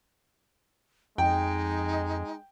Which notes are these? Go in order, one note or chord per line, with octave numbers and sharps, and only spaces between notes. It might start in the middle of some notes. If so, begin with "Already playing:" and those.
F2 G#3 D#4 G5